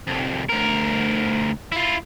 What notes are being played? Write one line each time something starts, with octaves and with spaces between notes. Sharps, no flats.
C2 F2
D2 A#4
E4 F4